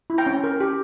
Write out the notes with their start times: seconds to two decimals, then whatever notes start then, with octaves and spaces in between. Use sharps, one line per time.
0.10 E4
0.18 G5 A#5
0.26 C#4
0.44 A#4
0.60 G4